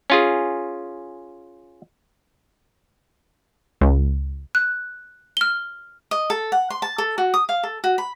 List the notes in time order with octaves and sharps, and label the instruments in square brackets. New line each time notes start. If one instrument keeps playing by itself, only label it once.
[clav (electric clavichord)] C#4 F4 G#4
[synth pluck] C#2
[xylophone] F#6
F6 G7
[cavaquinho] D#5
A4
F#5
C6
A5
A4
F#4
D#6
F5
A4
F#4
B5